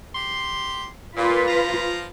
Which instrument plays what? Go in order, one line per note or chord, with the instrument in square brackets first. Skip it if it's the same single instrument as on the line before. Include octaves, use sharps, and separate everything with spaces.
[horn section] G4 C6
[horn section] A#2 [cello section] F4 B4
[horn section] F3 F5 A#5